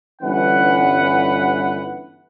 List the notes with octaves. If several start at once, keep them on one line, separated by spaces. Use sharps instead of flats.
G1 G2 E3 C#4 B4 F#5